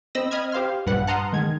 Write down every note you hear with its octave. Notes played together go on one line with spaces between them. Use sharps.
C4 D#5 B5 E6 A#6
D#5 B5 D#6 F6 G#6
G4 C5 F5 C6 F6
A#1 G2 B4 F#5 F#6
F#5 A5 A#5 C6 D#6 F6
D#3 G#3 G#6